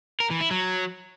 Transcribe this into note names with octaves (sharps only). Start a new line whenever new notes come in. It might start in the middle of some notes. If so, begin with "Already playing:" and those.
A#4
E3
E4
F#3